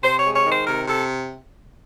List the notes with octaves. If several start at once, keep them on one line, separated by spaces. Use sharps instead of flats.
C3 C5
C#5
G#3
C#5
D#3
C5
C3 A#4
C3 A4